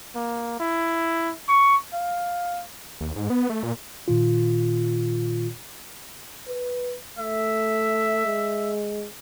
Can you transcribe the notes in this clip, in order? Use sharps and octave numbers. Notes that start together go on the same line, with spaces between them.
A#3
E4
C#6
F5
D#2
G#2
B3
A3
A#2
A#2 D#3 F4
B4
A3 E5
G#3